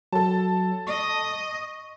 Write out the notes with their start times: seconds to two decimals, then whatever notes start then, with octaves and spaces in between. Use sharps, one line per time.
0.13 F#3 A4 A5
0.87 D#5 C#6